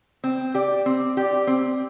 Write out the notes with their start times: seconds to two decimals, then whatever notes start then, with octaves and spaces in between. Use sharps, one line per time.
0.24 C4
0.54 G4 D5
0.86 C4
1.17 G4 D5
1.47 C4